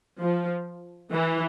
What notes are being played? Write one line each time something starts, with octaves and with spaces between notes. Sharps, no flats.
F3
E3